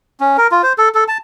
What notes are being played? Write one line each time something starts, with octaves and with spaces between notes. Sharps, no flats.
C#4
A#4
F4
C5
A4
A4
A5